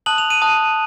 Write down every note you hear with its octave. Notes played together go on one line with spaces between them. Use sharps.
A5 D#6 F#6 F#7
F7
D#7
A5 D#6 F#6